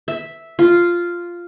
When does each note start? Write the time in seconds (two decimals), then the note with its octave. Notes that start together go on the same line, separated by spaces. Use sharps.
0.08 E5
0.59 F4